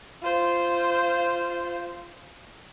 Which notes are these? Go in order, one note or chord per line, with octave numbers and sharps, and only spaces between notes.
F4 C5